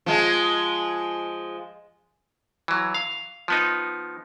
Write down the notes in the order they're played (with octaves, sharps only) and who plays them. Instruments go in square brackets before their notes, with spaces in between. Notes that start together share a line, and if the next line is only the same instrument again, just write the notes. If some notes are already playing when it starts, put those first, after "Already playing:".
[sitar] F3 G#3
[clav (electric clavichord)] E3 F#3
F5
F3 B3 D#4